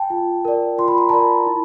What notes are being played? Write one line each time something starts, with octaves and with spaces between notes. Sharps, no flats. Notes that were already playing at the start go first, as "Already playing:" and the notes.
Already playing: G5 A5
F4
A#4 D5
F4 C6
B5
A#5
A#4 D5 A5 B5
E4